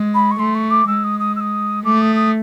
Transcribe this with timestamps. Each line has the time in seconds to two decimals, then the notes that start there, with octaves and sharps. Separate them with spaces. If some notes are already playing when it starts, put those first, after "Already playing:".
Already playing: G#3
0.14 B5
0.31 C#6
0.39 A3 C6
0.55 C#6
0.70 D6
0.87 G#3 E6
1.04 D#6
1.20 D#6
1.36 E6
1.40 D#6
1.85 A3 D6
2.01 D#6
2.16 D#6